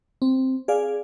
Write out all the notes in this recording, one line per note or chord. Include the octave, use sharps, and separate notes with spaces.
C4
G#4 D5 F5 G#5